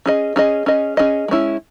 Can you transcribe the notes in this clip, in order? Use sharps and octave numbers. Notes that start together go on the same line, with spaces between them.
C#4 G#4 D#5
C#4 G#4 D#5
C#4 G#4 D#5
C#4 G#4 D#5
G#3 C#4 E4